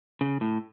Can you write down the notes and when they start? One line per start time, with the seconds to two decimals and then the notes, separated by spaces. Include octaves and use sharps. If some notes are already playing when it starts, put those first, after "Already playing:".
0.21 C#3
0.41 A2